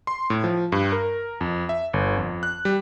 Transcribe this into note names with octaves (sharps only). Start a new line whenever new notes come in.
C6
A2
F3
G2
A#4
F2
E5
G1
F2
F#6
G3